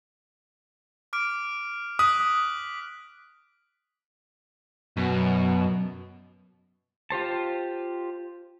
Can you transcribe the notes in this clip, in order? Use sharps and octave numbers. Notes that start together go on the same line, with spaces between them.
D6 F6 D7
D#6 F#6 B6 F#7
F#2 B2
F4 G4 C5 A5